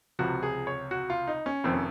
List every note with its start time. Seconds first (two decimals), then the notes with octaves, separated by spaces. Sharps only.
0.19 C#2 C3 F3 F#4
0.43 G#4
0.67 C#5
0.91 F#4
1.10 F4
1.28 D#4
1.46 C#4
1.64 F1 F2 D#3 C4
1.73 C#4